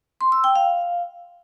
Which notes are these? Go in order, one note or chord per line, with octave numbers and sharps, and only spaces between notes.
C6
E6
G5
F5